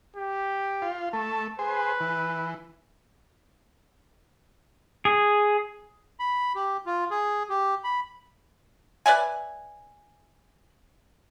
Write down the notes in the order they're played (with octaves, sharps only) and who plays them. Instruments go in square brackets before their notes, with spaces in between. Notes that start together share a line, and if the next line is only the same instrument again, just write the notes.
[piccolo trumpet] G4
[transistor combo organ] F4
[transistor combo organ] A3 [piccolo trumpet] A5
[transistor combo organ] G#4 C5 [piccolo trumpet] B4
[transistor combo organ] E3
[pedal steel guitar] G#4
[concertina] B5
G4
F4
G#4
G4
B5
[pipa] B4 D5 E5 G#5